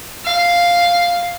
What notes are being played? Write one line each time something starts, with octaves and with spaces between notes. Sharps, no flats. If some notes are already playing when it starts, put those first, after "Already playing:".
F5